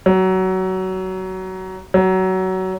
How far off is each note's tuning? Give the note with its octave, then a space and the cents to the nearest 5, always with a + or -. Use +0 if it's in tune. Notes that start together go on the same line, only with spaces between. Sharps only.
F#3 +20
F#3 +20